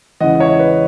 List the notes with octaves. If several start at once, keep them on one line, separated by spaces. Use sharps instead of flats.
E2 C#3 E3 G#3 D#5 F#5
C#5 E5
B4 D#5